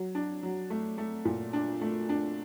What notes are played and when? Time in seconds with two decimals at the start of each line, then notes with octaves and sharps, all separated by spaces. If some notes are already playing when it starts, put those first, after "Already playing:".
Already playing: F#3
0.15 D4
0.43 F#3
0.70 A3
0.98 A3
1.25 A#2
1.53 D4
1.81 A3
2.09 D4